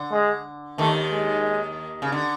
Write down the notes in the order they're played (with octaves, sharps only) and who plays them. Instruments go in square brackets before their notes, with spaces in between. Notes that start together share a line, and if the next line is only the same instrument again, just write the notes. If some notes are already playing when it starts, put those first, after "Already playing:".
Already playing: [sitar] D3
[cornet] G#3
[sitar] D#2 D#3 [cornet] A3
[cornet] G#3
[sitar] C#3
D3